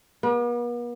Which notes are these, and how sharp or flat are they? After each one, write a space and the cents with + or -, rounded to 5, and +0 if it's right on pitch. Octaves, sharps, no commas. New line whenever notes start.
B3 -45